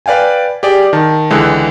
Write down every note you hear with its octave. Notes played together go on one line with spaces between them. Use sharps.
B4 D5 F5 G5 G#5
G4 G#4 D5
D#3 A5
C#2 D3 E3 G#3